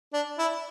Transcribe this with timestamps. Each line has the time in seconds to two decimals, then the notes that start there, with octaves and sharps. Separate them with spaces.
0.13 D4
0.39 E4